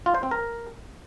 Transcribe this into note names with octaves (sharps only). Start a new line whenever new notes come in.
F4
C5
C4
A#4